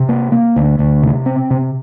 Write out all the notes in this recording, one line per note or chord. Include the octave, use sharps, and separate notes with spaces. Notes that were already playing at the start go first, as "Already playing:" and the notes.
Already playing: C3
A#3
A#3
D2
D2
C3
C4
C3